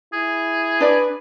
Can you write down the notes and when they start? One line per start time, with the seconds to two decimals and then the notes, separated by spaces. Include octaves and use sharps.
0.13 E4 G#4
0.80 D4 B4 D5